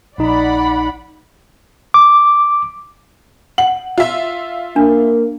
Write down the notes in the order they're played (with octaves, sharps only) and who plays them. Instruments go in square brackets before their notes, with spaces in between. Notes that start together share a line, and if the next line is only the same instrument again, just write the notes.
[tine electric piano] A#1 D#4 [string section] D5 F#5 B5
[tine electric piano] D6
[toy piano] F#5 [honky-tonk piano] F#7
[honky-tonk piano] F4 E5
[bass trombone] A#3 [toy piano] D4